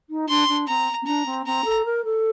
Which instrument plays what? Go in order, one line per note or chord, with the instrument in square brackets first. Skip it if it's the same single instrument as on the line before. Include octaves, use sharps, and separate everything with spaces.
[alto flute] D#4
[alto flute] D4 [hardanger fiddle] C6
[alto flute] D4
[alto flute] C4 [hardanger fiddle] A#5
[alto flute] C4
[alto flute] D4 [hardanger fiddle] A#5
[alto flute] C4
[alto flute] C4 [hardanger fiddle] A#5
[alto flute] A4
A#4
A4